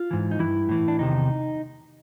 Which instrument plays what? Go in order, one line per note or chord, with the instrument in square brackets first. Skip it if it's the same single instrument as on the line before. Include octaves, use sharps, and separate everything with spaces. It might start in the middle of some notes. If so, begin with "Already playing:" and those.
Already playing: [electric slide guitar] F4
G#2 E3
D#4
G2 E3 E4
A2 E3
D4
E2 C3 D#3 D#4